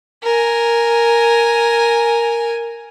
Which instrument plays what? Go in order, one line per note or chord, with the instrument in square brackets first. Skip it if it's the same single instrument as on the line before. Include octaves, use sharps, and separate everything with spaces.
[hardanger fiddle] A#4 G#5